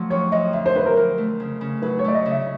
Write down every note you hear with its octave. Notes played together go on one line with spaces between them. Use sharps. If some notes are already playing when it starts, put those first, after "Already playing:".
Already playing: F3 F#3 A3 D4
F2 C#5
F2 D#5
D3 E5
C5
F#3 B4
A#4
F2
A3
C#3
C#3
F#3 B4
C#5
A3 D5
D#5
C#3
E5